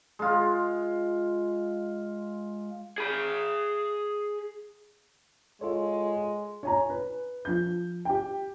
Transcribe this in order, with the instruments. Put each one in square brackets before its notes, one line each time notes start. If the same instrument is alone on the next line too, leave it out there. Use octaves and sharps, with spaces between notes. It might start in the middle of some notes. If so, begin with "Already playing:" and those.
[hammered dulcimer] G#3 F4
[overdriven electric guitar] G#4 B5
[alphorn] G#3 [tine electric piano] F4 A4 C#5
[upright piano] C#5 G#5 A#5
B4
F3 G6
G4 G5